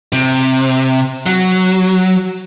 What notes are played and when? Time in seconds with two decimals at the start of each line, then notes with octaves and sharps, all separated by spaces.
0.13 C3
1.26 F#3